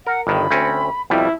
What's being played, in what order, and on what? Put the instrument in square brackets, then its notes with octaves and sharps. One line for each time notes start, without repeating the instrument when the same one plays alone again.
[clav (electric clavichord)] A#4 [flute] F#5
[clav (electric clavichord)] G1 G2 D#3 [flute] B5
[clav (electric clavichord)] D2 C4 C#4
[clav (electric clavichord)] F2 B2 G3 [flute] E4